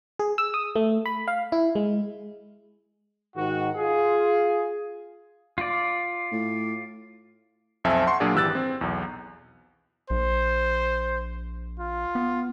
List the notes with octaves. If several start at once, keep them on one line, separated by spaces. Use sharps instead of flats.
G#4
E6
D#6
A3
B5
F5
E4
G#3
G#2 D#3 F#4
F4 G#4
F4 D5
A2
B1 F2 C4 E5 G#5 A5
F#5 C6 C#6
A#2 F#3 D4 F4 G#4
G#1 E3 G4 E6 F#6 A6
C4
B1 E2
A#1 C5
F4
B3